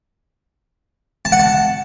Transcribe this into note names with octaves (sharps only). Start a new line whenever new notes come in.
A5
F#5
A5